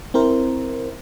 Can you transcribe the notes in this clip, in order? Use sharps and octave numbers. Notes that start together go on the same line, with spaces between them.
C4 E4 A#4 C5